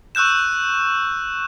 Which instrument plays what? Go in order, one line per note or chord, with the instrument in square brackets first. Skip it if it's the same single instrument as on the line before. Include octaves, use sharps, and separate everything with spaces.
[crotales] C#6 E6 F#6 G6 E7